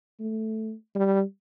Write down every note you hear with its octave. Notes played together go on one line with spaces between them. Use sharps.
A3
G3